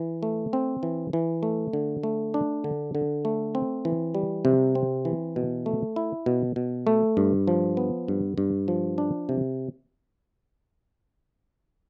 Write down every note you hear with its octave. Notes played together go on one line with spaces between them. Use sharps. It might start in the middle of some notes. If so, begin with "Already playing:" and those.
Already playing: E3
A3
C4
E3
E3
A3
D3
A3
D4
D3
D3
A3
C4
E3
G3
C3
C4
E3
B2
A3
E4
B2
B2
A3
G2
F3
B3
G2
G2
F3
D4
C3